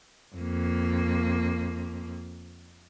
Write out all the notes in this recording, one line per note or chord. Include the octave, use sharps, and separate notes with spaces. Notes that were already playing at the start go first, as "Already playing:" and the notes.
F2 A#3